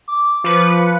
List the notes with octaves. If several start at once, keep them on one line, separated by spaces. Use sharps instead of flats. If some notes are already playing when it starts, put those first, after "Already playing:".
D6
F3 B4 C#7